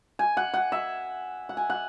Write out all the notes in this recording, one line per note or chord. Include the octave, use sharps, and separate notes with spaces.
G#5
F#5
F#5
E5
F#5
G#5
F#5